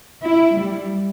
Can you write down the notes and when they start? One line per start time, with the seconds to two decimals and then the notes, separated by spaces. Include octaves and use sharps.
0.23 E4
0.56 G3